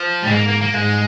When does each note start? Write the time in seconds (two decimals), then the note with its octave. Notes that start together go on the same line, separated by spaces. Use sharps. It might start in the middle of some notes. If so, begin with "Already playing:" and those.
Already playing: F3
0.23 G#2 G3
0.29 G#3
0.35 A#3
0.48 A#3
0.61 A#3
0.74 G#2 G#3